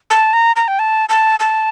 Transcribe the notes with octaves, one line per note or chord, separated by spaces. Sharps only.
A5
A#5
A#5
G5
A5
A5
A5